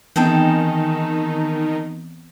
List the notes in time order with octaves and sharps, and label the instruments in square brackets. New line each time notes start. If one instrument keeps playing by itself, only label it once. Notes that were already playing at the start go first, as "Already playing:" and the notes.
[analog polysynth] D#3 D#4 [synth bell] E3 B3 C4 [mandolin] G#4 A4 G5